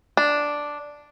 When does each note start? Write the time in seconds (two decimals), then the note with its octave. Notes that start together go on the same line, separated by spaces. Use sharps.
0.17 D4